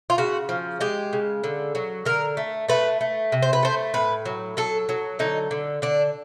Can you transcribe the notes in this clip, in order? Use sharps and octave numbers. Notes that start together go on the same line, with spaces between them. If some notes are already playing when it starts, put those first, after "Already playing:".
F4
C#3 F#4
F3
G#3 G4
C#3
D3
F#3
D3 A#4
A3
A3 B4
A3
C3
C5
B4
A3 C5
A2 B4
F#3
F#3 A4
F#3
D3 D#4
D3
D3 D4